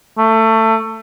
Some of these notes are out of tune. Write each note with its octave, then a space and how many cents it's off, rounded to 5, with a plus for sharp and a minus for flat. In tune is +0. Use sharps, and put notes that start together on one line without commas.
A3 +20